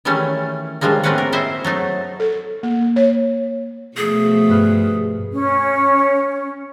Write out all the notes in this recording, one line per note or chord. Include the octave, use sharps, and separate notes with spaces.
D#3 E3 G3 A3 C#4
A2 D#3 F3 G3 G#3 A#3
A3 A#3 C4 C#4 B4 F#5
A#4
E4 C5 D#5 E5
F#3 A3 D#4
A4
A#3
C#5
B2 F3 A3 G#4
G2 B4 F6
C#4